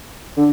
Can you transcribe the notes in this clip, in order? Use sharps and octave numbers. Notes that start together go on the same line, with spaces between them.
D3